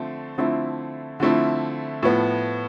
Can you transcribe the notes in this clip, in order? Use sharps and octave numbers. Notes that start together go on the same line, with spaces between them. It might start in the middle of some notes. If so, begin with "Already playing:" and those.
Already playing: D3 F3 A3 C4
D3 F3 A3 C4 E4
D3 F3 A3 C4 E4
A2 F3 B3